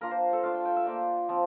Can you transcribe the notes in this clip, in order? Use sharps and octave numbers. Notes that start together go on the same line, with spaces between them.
A#3 D4 F4 A#4
C5
A4
A3 D4 F4 F5
G5
G5
E5
A#3 F4 D5
F3 C4 F4